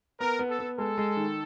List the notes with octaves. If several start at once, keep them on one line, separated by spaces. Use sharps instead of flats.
B3 A#4
B3
A4
B3
G#3 A4
G#3
D#3